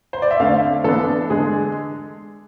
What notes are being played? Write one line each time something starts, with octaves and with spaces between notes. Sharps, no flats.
C5
D5
E5
D3 A3 C4 F5
E3 B3 D4 A4
D3 G#3 D4 G#4